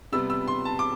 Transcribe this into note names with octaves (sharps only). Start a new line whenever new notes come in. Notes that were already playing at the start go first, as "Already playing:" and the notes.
C3 G3 B3 E6
E6
C6
A5
D6